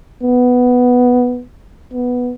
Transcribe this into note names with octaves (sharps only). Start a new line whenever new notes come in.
B3
B3